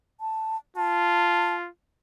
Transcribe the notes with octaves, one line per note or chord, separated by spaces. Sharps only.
A5
F4 A5